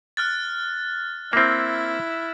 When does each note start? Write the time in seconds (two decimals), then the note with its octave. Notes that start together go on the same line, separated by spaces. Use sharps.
0.17 F6 F#6 A6
1.33 A#3 C4 E4